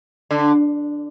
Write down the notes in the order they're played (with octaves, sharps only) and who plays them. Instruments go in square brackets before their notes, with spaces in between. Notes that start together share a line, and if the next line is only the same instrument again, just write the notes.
[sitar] D3